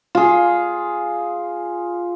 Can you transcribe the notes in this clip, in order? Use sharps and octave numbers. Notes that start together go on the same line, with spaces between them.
F4 G#4